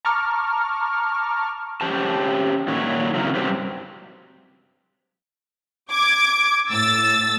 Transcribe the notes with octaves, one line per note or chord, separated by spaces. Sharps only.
A5 A#5 C#6 D6 F6
C#4 G4 C5 A5
A#2 D#3 F#3 C#5
C#3 F#3 C4 E4 A#4
G2 F#3 C4 G4 C5
D6 G#6
A2 E6 A6